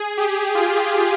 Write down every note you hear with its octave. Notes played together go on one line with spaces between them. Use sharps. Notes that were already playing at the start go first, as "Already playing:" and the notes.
Already playing: G#4
G4
F4